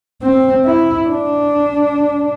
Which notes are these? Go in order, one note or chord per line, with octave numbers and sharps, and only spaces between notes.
C4
E4
D4